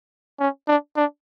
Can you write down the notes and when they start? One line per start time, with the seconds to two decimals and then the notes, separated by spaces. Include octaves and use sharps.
0.40 C#4
0.68 D4
0.96 D4